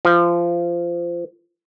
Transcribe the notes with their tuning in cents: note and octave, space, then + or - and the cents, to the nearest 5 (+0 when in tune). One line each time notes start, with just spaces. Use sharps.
F3 -20